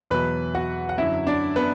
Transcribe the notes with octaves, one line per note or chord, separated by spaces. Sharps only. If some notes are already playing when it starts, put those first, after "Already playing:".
E2 B2 F#3 B4 B5
F#4 F#5
F#5
F#2 D3 F#3 E4 E5
D4 D5
B3 B4